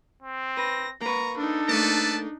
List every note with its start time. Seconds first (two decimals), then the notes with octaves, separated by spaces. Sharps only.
0.22 C4
0.57 B4 A#6
1.01 A#3 B4 A#5 C#6
1.38 D4 D#4 A4
1.69 A3 A#3 B4 D5 A5